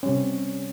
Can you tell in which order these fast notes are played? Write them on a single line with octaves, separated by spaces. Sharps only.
C#4 G3 C3